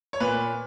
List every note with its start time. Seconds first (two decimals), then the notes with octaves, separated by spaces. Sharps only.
0.13 C#5
0.20 A#2 B4